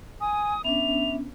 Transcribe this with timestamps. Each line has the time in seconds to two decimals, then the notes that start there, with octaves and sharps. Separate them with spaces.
0.21 G#5 D#6
0.64 B3 C#4 D4 E5 F7